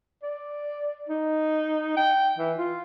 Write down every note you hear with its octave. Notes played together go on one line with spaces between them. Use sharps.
D5
D#4
G5
E3
F4